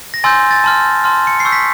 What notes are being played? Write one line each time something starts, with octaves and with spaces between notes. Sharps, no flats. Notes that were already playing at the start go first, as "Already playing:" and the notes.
A#6
G#5 C6 E6 G6 A6
A6
A5 C6 F6
A5 C6 F6
C#7
C7
C#6 E6 G6
B6